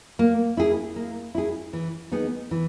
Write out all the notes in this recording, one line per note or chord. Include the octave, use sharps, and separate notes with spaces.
A#3
E4 G#4
A#3
E4 G#4
E3
B3 D#4 G#4
E3